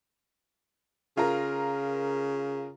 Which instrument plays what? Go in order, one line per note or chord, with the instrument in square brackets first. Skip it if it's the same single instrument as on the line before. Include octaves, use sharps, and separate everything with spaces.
[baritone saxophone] C#3 [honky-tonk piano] F4 A#4